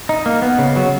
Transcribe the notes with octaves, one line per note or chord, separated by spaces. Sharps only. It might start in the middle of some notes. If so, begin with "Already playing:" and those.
D#4
A#3
B3
C#3
F#3